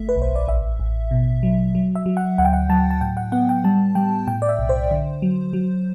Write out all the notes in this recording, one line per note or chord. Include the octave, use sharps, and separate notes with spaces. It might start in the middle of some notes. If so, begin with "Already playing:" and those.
Already playing: G1 A3 E5
B4
B1
C5
D5
A1 E5
A1
B2
F#3
F#3
E5
F#3
F#5
D2 F#5
G5
F#5
F#3 A5
A5
A2 G5
F#5
B3 F#5
G5
G3 A5
G3 G5
A2 G5
D5
E5
B1
C5
D3
F#3
F#3